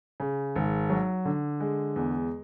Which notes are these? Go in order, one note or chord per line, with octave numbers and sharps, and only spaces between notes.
C#3
G#1
F#3
D3
G#3
E2